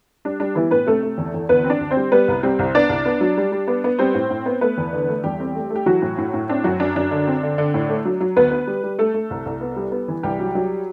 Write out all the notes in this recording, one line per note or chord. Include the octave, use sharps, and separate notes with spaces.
G3 D4
G3 D4
E3 B3 E4
A2 B3 B4
C3 A3 A4
A3
E2
E2
D2 B3 B4
C4
D4 D5
D2
C4 C5
G3
G3 B3 B4
C2
G3 C4 C5
C2
B3 D4 D5
C2
B3
F#3
G3
G3
B3
B3
G3 C4 C5
A2
A2
B3
A3 B3 B4
E2
D3
A3
E2 G3 G4
C4
A3
A3
G4
E3 F#3 F#4
A2
A2
A2
C4 D4
F#2 F#3 F#4
F#2 D4
F#2 D4
D3
C4
D3
D3
A2
A3
F#3
F#3
D2 B3 B4
B3
G3
G3
A3 A4
A3
C2
C2
B3
G3
B3
E3
C2 G3 G4
F#3
F#3